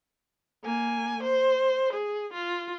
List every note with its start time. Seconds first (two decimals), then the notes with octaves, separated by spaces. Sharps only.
0.64 A#3 G#5
1.23 C5
1.93 G#4
2.33 F4